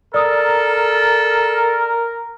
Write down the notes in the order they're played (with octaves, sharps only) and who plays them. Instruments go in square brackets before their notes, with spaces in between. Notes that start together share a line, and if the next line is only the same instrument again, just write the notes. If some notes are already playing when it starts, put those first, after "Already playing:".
[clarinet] A4 [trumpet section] A#4 [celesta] D5 D#6